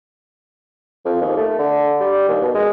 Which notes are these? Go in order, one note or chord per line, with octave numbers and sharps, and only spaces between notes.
F2
D#2
A3
D3
G3
D#2
B2
G#3